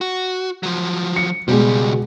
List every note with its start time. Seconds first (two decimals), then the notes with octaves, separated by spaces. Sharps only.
0.01 F#4
0.63 F3 F#3
1.16 C#7
1.48 C#2 B2 G3 G#3